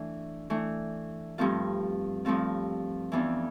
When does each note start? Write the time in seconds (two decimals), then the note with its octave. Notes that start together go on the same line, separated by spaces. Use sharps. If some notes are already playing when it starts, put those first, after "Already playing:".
Already playing: E3 A3 D4
0.50 E3 A3 D4
1.38 G2 F3 A3 C4 F4
2.25 G2 F3 A3 C4 F4
3.12 F2 E3 B3 D4